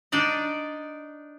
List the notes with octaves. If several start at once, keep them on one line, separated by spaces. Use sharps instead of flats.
D4 D#4 D5 D#5